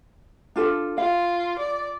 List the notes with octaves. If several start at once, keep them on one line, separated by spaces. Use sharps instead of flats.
D4 F4 A4
F4 F5
D5